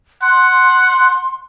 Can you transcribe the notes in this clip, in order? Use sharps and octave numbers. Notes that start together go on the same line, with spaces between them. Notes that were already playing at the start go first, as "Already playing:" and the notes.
F#5 C6